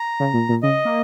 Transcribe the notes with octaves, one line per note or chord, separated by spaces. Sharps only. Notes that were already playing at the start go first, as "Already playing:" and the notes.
Already playing: A#5
C#3
A#2
A#2
C#3 D#5
A#3